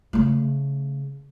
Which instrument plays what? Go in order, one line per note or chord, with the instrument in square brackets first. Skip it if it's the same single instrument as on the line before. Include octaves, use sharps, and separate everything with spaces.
[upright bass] C#3 A3